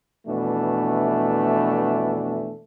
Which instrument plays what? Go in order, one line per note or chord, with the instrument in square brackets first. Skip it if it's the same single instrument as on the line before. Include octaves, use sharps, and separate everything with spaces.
[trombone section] F2 B2 E3 A3 D4